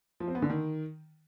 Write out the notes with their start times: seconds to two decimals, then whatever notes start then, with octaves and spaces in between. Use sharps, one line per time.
0.20 F3
0.28 C4
0.35 B3
0.42 D3
0.50 D#3